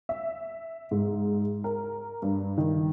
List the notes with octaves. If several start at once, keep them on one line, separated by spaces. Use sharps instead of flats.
E5
G#2
A#4
G2
D#3